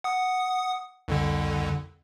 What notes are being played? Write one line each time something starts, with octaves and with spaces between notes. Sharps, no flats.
F#5 D#6
C2 F2 D3